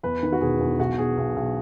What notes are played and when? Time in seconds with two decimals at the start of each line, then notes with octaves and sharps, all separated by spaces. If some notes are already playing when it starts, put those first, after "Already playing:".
0.03 E2 B4
0.23 D#3
0.32 F#4
0.41 E1 G#4
0.60 E2
0.79 B1 F#4
0.98 B1 G#4
1.17 B1
1.36 B1